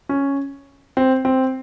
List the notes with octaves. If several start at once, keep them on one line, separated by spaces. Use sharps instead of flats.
C#4
C4
C4